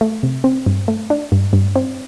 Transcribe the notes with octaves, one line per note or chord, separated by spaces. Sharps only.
A3
C3
C4
G2
A3
D4
G2
G2
C4